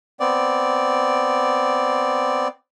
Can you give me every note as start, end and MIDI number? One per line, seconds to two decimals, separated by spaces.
0.20 2.48 59
0.20 2.48 60
0.20 2.48 74